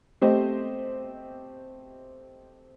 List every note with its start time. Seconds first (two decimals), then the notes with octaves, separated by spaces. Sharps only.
0.21 A3 C4 G4 C5 D#5